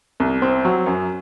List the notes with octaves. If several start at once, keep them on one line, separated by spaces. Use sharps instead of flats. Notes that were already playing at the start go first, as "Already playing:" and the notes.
C2
C4
F#3
F#2